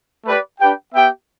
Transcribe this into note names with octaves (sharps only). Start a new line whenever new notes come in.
A3 G4 B4 D5
D4 G4 B4 G5
B3 G4 E5 G5